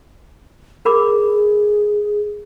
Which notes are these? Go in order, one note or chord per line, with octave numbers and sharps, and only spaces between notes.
G#4 A#4 B5 D6